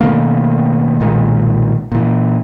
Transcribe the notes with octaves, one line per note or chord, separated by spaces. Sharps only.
B2 D#3 A3 A#3
B1 A#2 D#3 G#3
A#2 E3